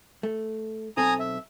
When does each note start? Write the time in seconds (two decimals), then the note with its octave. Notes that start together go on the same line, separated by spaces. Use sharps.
0.23 A3
0.97 B1 C4 A4 G#5 A#5 D#6
1.19 E5